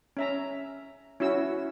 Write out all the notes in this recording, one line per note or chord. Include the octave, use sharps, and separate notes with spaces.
C#4 E5 A#5
C#4 E4 F#4 E6